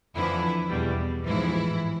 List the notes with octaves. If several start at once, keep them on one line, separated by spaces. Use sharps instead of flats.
F2 D3 E3 F3 E4
E2 B2 G3
A1 G#2 E3 F3 E4